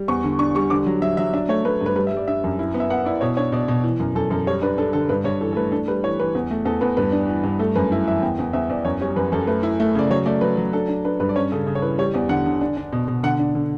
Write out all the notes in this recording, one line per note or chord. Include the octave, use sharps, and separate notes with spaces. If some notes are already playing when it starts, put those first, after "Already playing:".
Already playing: G3
E2 C#6
D3
D4 C#6
G3 C#6
D3 D6
F#3
F#3 E5
F#3 E5
D4 E5
A3 C#5
A3 B4
G2 B4
G3 B4
E5
G3
D5
D4 E5
F#2
E4
B3
E5
B3 F#5
E4 D5
B2 C#5
D4 C#5
B2 D5
B2
E3
F#2
F#2 A4
F#2 A4
G3 C#5
D4 B4
D4 A4
D3 A4
G2 B4
G2 C#5
E3 A4
A4
A3 B4
D4 A4
G3 B4
E3 C#5
E3 B4
E2
A3
E2 A4
E2 B4
G2 B4
D4
E3
G2
A3 A4
F#2 B4
E4
E3 E5
E2 G5
E2
E2 E5
E2 D5
F#2 C#5
G3 C#5
F#2 B4
F#2 A4
A3 B4
E4
A3
C#3 D5
F#3 C#5
A3 D5
F#3 B4
F#3
D4 A4
D4
D4 B4
G2 B4
D5
C#4 C#5
C#3 A4
C#3
C#5
E3 B4
G3 C#5
E2 D5
D3 F#5
D3
D4
D4
B2
B2
D3 F#5
D4
D3